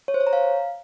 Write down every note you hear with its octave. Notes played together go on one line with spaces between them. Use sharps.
C#5
C5
C#5
A#5
F5